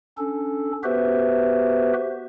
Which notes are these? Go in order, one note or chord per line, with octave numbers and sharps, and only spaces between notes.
C#4 D4 A4
B3 F#4 G4 B4 C5 E5